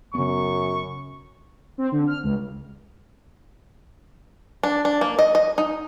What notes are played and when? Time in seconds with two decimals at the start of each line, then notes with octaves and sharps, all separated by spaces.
0.15 F#2 C#3 B3 C#6
1.78 C4
1.92 D3
2.07 F6
2.23 C#2
4.63 D4
4.85 D4
5.01 A#3
5.19 D#5
5.35 D#5
5.58 D#4